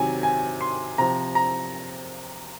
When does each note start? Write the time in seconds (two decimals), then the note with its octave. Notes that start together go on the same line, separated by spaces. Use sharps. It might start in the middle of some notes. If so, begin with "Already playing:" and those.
Already playing: C3 D#3 F#3 G#5
0.23 G#5
0.61 C6
0.98 C3 F3 A#5
1.35 A#5